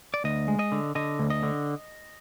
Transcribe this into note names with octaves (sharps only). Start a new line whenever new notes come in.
D5
D2 D#5
G#3
D#5
D3
D3 D#5
D2
D#5
D3